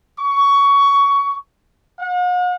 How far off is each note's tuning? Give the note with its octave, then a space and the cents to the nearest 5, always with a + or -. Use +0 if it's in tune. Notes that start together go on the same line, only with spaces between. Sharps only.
C#6 +20
F#5 -45